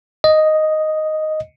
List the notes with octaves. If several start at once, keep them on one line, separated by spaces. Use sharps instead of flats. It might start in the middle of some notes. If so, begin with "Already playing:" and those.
D#5